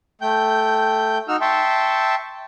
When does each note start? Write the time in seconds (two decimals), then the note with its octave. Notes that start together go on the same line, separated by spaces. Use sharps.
0.21 A3 G5 G6
1.28 D#4 F#4 E6 F6
1.41 E5 G5 A5 C6 C#6